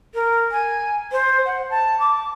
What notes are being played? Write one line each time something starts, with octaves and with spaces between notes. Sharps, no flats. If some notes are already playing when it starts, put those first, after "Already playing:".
A#4
G#5
C5
F#5
A5
D6